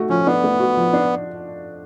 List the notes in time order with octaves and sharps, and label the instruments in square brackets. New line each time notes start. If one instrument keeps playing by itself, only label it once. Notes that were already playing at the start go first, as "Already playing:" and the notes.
Already playing: [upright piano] A3 F#4
[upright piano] F3 [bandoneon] C#4
[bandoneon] B3 [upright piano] D4
[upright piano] A3
F#4
F3
D4